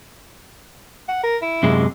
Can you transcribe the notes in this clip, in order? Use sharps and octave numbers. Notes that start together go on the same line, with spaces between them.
F#5
A#4
E4
F#2 C3 G#3